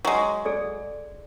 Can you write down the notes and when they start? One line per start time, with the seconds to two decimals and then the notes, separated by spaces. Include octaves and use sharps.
0.05 F#3 G#3
0.45 G#4 A4 D5